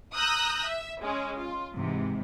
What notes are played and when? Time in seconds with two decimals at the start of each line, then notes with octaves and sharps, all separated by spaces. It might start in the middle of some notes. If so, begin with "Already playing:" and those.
0.16 A#5 D#6 E6 F#6 G6 A#6
0.65 E5
1.02 G#3 C#4 G#4
1.36 F4
1.74 G#2 C3 E3